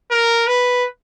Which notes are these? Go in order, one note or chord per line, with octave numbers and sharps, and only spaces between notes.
A#4
B4